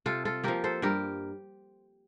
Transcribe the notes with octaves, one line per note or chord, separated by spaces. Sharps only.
C3 F4 A4
F4 A4
F3 A#3 G4 A#4
A4 C5
G2 G4 A#4